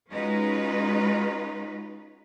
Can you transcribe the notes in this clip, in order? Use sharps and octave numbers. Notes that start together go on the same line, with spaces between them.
G#3 C#4 D#4 F4 F#4 B4